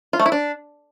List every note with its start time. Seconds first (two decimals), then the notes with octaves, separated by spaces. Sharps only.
0.13 F4
0.19 A3
0.26 E4
0.32 D4